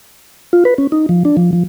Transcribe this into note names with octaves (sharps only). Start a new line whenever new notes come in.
F4
B4
C#4
D#4
F3
D4
F3
F3